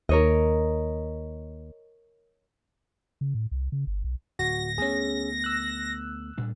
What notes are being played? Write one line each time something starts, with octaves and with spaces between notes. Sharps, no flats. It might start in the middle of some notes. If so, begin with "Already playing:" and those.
D#2 A#4 C#5 D#5
C#3
A2
C2
C#3
G1
B1
D1 F#4 A#6
D2 A3 B3 C#4 G#4
E6 F#6
A2 G3 D4